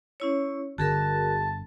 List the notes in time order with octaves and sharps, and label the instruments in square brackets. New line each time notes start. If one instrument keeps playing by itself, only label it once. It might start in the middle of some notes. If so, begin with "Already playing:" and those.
[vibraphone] C#4 E4 C#5
[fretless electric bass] G1 D3 [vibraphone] F#4 G#4 A#4 [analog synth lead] A5